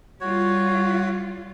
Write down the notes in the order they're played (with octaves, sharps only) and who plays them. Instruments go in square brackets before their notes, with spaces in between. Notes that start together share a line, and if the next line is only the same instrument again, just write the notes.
[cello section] G3 F4 [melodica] F#4 C#5